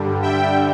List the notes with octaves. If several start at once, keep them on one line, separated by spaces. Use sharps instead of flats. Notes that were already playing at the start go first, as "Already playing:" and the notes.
Already playing: G2 D3 G3
E5 G5